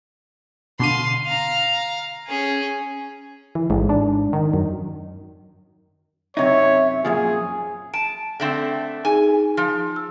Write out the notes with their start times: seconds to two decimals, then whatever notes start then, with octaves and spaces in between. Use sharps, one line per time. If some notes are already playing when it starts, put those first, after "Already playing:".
0.80 B2 D3 F5 C6 D#7
1.26 F5 A#5
2.28 C#4 G#4
3.55 E3
3.70 A1 G#2
3.89 D4
4.33 D#3
4.53 F#2
6.37 F#2 C3 D#4 C#5 E5
7.05 F#2 A#2 F3 G#4
7.94 A5 D7
8.40 D3 A3 C4
9.05 D#4 G#4 G#5
9.57 F3
9.96 E6